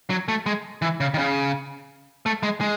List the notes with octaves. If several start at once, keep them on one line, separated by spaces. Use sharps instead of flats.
F#3
A3
G#3
E3
C#3
D#3
C#3
A3
G#3
G#3